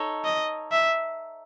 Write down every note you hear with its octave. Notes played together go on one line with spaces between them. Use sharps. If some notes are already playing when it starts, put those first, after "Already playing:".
Already playing: D#4 A4 C#5
D#5
E5